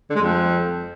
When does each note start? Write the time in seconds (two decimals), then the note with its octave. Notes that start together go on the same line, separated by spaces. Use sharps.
0.10 D3
0.15 G#3
0.21 F2